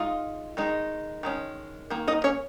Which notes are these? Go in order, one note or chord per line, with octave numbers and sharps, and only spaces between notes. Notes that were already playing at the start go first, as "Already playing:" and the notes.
Already playing: G#3 D#4 F4 F5
D#3 G#3 D#4
D#3 G#3 C#4
D#3 A#3
D#4 D#5
C#4 C#5